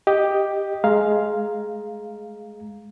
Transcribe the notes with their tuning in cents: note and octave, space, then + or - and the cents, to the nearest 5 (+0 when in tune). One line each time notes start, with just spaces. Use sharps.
G4 +5 D#5 +0
G#3 +15 F5 +0 A#5 +0